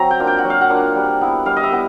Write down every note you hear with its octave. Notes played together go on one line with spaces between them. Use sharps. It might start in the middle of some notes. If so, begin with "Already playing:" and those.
Already playing: F#3 C4 A#5
G5
A#3 D4 F4
G5
F#5
F#3
F5
F#5
A#3 D4 F4
G3
B3 E4
G3 F5
D#5
E5
B3 E4